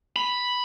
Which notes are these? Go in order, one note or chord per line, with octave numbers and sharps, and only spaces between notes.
B5